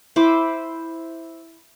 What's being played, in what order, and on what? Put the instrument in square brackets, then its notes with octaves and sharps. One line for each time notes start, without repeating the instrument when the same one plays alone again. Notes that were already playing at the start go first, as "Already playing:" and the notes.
[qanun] E4 C5 B5 D6